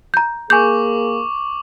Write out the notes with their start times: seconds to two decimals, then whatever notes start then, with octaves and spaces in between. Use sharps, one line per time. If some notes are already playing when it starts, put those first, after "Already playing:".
0.14 A#5 G6
0.50 A#3 G#4 G#5 C#6 D6 G6 F#7